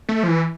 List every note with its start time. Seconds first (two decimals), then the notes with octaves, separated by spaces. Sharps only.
0.09 A3
0.23 F3
0.28 E3